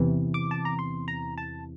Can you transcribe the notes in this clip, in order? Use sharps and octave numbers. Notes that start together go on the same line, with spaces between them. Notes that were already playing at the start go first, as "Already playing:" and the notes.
Already playing: E2 C3 E3
D6
A5
A#5
C6
A#5
A5